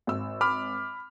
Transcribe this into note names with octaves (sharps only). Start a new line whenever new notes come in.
G#1 E6
B5 D6 F6